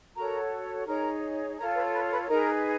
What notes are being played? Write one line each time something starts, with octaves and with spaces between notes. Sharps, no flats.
F#4 A4 A#4 C#5 A#5
D#4 G#4 A#4 C#5 A#5
F4 A4 A#4 C#5 A#5
B4 B5
B4 B5
B4 B5
D#4 G#4 A#4 B4 A#5